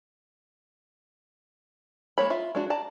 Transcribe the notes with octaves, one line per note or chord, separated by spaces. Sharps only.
G#3 A#3 C#5 B5
F4 E5
G#3 D4 F#4
D5 A5 A#5